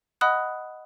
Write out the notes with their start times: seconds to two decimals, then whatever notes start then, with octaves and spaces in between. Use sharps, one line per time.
0.21 D#5 F#5 B5 D#6 F#6